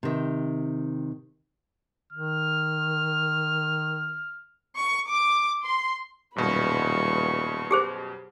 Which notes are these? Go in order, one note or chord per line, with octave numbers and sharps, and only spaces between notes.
C3 D#3
D#3 F6
C#6
D6
C6
D#1 F#2 B2 G3 B4 C#6
G4 G#4 C5